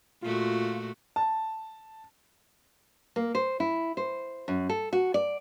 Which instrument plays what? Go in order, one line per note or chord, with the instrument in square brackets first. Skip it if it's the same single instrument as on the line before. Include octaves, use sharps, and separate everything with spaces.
[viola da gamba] A#2 A3 F#4 [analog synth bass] F4
[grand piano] A5
[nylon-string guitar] A#3
C5
E4
C5
F#2
A4
F#4
D5